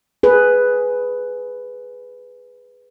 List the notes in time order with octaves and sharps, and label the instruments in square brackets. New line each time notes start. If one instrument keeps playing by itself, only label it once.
[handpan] G#4 B4